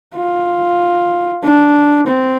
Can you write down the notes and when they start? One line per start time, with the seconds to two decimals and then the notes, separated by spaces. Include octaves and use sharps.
0.16 F4
1.44 D4
2.07 C4